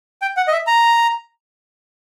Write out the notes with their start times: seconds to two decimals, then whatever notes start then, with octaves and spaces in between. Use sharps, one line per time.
0.22 G5
0.37 F#5
0.48 D#5
0.52 E5
0.67 A#5